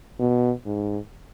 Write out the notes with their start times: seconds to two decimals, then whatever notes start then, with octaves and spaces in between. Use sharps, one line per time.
0.19 B2
0.66 G#2